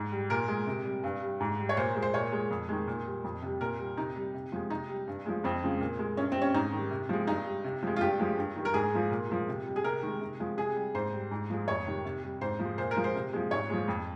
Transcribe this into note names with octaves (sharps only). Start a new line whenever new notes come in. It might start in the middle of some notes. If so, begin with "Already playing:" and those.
Already playing: G#2
G3
A#2 A#4
G#3
C3
G3
G2
G3
G#2
G3
C#5
A#2 C5
G#3
C5
A#2 C#5
G#3
F2
D#3 G#3
A#2
G3
F2
C3 G3
A#2 A#4
G3
C3 D#4
G3
C3
F3 G#3
C3 D#4
G3
G2
F3 G#3
F2 C4
C#3 F3 G#3
A#2
G#3
G2 C#4
G3 C4
C#4
G#2 D#4
D#3 G3
C3
F3 G#3
G2 D#4
G3
C3
F3 G#3
F4
G2 G4
F3 G#3
G2
D#3 G3
A#4
G#2 G#4
F3 G#3
A#2
F3 G#3
C3
G3
G#4
C3 A#4
D#3 G#3
C3
F3 G#3
C3 G#4
G3
G#2 C5
G3
G#2
F3 G#3
F2 C#5
C3 D#3 G3
C3
G3
G#2 C5
F3 G#3
A#2 C5
A#4
F3 G#3
C5
C3
F3 G#3
G#2 C#5
F3 G#3
F2